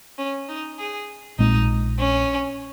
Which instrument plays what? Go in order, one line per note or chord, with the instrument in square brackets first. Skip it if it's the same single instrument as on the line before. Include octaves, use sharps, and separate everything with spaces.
[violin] C#4
D#4
G#4
[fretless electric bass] A#1 A#2 G#3 C4 [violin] D#4
[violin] C#4